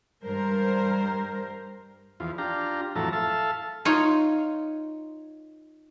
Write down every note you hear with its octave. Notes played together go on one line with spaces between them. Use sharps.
G2 G3 A#4 C5
E2 F3
D4 F4 G4 A#5
F2 A2 E3 F#3 A5 A#5
A4 E5 F5 A5
D#4 F4 C#5